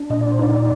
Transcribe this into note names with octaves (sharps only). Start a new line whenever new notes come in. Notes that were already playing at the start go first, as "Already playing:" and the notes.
Already playing: D4
A#2 D#5
D5
C5
D#4 D5